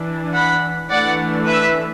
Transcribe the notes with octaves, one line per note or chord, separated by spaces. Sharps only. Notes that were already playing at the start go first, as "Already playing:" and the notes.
Already playing: E3 D4
F#5 B5
E3 A3 D4 D5 F#5
B4 E5